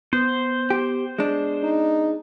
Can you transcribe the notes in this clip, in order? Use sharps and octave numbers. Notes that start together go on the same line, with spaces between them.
B3 C5
G4
G#3 D4
D#4